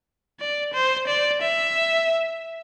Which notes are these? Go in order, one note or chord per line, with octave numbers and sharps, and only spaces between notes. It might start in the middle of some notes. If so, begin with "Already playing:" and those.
D5
C5
D5
E5